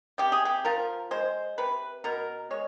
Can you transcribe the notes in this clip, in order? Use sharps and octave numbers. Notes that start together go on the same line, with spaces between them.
C3 G4
G#4
G4
F3 A#4
G#3 C5
C3 B4
B2 A#4
G#3 C#5